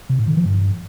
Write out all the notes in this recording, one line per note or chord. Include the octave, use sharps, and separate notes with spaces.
C3
A2
D#3
F3
G2